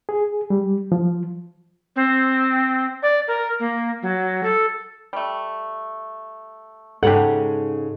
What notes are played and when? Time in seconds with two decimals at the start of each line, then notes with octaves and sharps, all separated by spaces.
0.09 G#4
0.50 G3
0.92 F3
1.96 C4
3.02 D5
3.28 A#4
3.60 A#3
4.02 F#3
4.43 A4
5.13 G3 A3
7.03 G#2 C#3 G#3 G4 A4 F#5